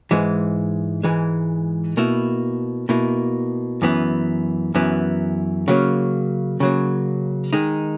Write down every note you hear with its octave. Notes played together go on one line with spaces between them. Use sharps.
G#2 E3 G#3
G#2 E3 G#3
B2 A#3 E4
B2 A#3 E4
F#2 E3 B3
F#2 E3 B3
C#3 F#3 A#3
C#3 F#3 A#3
D#3 G#3 D#4